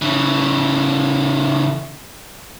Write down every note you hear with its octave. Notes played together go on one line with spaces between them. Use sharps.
C#3 E3